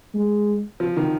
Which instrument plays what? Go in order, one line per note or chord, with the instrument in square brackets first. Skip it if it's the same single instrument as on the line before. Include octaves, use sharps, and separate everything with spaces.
[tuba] G#3
[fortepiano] F3
D#3